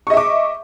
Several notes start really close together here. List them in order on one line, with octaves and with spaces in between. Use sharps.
C#6 D#5 E5 D6